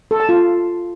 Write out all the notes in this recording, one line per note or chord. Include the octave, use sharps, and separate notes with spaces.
A4
A5
F4